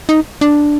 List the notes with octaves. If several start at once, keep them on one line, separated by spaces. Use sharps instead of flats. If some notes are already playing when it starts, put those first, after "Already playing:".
D#4
D4